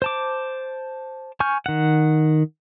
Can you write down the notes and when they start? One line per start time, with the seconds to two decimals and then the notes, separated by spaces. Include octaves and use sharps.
0.02 C5 A5 D6
1.40 G#5 C#6 F6 G6
1.66 D#3 F#5